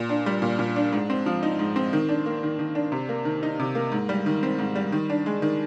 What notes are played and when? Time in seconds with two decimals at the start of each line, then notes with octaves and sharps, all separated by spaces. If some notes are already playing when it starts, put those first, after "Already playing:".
Already playing: A#2
0.09 D4
0.26 G3
0.42 A#2
0.59 A#2
0.76 D4
0.93 G#2
1.10 C4
1.26 F3
1.43 D#4
1.59 G#2
1.76 C4
1.93 D#3
2.09 D4
2.26 A#3
2.43 D#3
2.59 D#3
2.75 D4
2.92 C3
3.09 A#3
3.25 D#3
3.43 D#4
3.59 C3
3.75 A#3
3.92 G#2
4.09 G3
4.26 D#3
4.43 C4
4.59 G#2
4.75 G3
4.92 D#3
5.10 D4
5.26 G#3
5.42 D#3